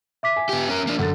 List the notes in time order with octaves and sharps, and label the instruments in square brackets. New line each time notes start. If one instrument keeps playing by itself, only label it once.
[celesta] E5 D6 B6
[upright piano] G#5
[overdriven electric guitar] B3 G4
C#4 A#4
A#3 D4
[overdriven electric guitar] F#2 [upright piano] D3 A6